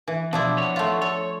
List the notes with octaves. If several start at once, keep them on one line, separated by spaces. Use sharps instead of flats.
E3
B2 F3 D4 E4
B3 C#5
A3 F4
A4 C#5